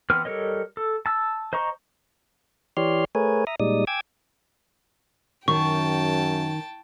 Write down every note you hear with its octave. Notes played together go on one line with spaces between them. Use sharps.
E3 B3 C4 B4 F6
G3 A4 A#4 C#5 D#5
A4
A5 E6
C5 D#5 A#5 C#6
E3 G4 C#5 D5 C6 F6
A3 G#4 A#4 B4 C#5 G#5
E5 A#5 D#6
A#2 G3 G#3 D#4 D5 D#6
G5 G#5 D6 E6 G#6
F#2 D#3 G5 A5 C#6